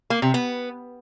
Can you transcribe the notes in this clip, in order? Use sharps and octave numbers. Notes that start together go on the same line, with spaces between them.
A#3
C3
B3